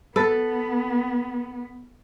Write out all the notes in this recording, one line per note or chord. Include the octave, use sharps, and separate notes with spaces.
B3 A4 B4